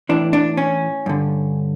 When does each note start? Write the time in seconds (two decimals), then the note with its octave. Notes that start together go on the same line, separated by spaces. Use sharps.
0.09 A2 E3 D4
0.33 D4
0.57 C#4
1.06 G2 D3